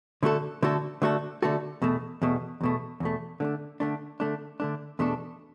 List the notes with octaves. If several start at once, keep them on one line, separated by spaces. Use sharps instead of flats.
D3 A3 F#4 A4
D3 A3 F#4 A4
D3 A3 F#4 A4
D3 A3 F#4 A4
E2 B2 A3
E2 B2 A3
E2 B2 A3
E2 B2 A3
D3 A3 D4
D3 A3 D4
D3 A3 D4
D3 A3 D4
E2 B2 A3 D4 A4